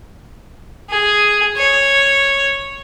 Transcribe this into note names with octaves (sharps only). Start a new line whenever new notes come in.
G#4
C#5